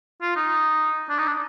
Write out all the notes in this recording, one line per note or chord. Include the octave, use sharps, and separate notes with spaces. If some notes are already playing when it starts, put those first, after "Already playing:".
F4
D#4
D4
D#4
D4